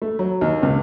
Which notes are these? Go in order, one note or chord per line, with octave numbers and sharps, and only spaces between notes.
A3
F#3
D#2
C#2